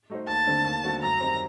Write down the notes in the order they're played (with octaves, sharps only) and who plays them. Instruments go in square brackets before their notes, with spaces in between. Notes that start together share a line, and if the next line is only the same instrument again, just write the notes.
[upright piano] A3 D#4 F#4 C5
[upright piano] D#2 [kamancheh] A5
[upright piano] D3 A3 C4
D#2
D3 A3 C4 F#4
[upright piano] F#2 [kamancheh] A#5
[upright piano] D#3 G3 C4 D#4